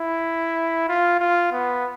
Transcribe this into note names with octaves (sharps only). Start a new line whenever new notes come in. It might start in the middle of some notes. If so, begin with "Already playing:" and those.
Already playing: E4
F4
F4
B3